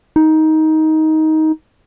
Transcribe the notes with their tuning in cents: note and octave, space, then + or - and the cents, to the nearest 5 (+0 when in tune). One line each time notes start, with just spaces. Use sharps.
D#4 +15